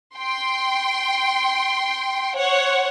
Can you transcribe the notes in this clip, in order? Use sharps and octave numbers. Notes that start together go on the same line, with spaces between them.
G5 C6
C5 C#5 F#5